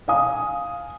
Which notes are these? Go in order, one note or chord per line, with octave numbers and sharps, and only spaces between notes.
F5 G#5 D#6